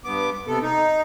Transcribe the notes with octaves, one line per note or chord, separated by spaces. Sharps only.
G2 B3 D6
C3 B3 A4
D#4